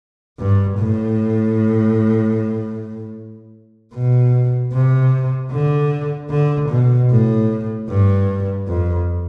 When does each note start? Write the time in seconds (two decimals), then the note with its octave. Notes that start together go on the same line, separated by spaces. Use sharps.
0.39 G2
0.78 A2
3.94 B2
4.73 C3
5.51 D3
6.30 D3
6.70 B2
7.10 A2
7.89 G2
8.67 F2